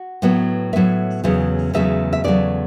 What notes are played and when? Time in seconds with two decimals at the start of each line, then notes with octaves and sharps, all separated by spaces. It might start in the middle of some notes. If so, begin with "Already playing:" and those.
Already playing: F#4
0.22 A2 F#3 B3
0.73 A2 F#3 B3 E5
1.24 E2 C#3 F#3 A3
1.73 E2 C#3 F#3 A3 E5
2.13 E5
2.24 E2 C#3 F#3 A3 D5